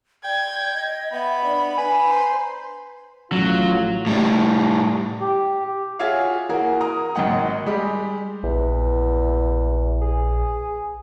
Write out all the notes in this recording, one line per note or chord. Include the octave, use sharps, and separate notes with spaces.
D5 G5 G#6
D#5
B3 E5 B5
D4 D5
B4 G#5
C5 A#5
A1 F#3 A3 F4
A2 G3
G4
F4 F#4 G#4 C#5 E5 F5
E3 A#3 F#4 G#4 A#4
A#4 A#5 D#6
G#1 D#3 F#3 D#5 F#5 G5
G3 G#3 G4
A#1 E2
G#4